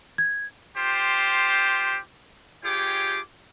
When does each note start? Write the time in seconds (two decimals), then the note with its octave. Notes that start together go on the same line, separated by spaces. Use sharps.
0.18 G#6
0.78 F4 G4 C5
2.65 F4 G4 G#4 C#5 G5 D6